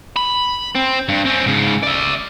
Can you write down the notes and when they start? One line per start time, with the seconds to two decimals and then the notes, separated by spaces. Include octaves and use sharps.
0.17 B5
0.75 C4
1.08 G2
1.25 C4 C#4
1.46 G#2 C#3
1.84 D5 E5